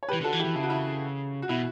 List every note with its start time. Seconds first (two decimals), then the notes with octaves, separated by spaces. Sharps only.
0.03 C#5
0.09 G4 B4
0.13 E3
0.21 D3 F#4 A4
0.33 E3
0.40 E4 G4
0.44 E3
0.55 C#3 E4
0.63 F#4
0.70 E4
1.42 F#4
1.49 B2 E4